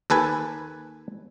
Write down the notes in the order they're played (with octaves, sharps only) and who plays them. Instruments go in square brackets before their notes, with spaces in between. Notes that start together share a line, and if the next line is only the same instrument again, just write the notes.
[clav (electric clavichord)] D#2 A4 B4 G#5